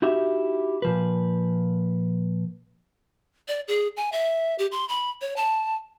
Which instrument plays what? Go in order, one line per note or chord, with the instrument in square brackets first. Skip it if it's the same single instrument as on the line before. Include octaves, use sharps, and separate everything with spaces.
[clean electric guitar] D#4 E4 F#4 G4 E5
A#2 F3 B4
[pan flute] D5
G#4
G#5
E5
G4
C6
B5
C#5
A5